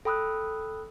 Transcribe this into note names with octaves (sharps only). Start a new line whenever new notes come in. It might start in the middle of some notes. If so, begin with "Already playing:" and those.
A4 G5 B5 D#6 E6 F#6